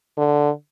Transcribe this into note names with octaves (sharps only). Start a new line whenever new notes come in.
D3